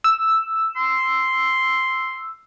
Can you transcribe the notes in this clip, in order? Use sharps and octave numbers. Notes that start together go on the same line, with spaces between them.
E6
C6